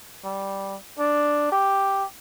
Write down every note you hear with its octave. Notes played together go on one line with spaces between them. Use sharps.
G3
D4
G4